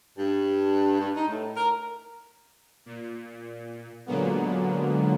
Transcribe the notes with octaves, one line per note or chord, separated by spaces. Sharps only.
G2
G2
D#4
A2
A#4
A#2
A#2 D3 F#3 G#3 A#3 B3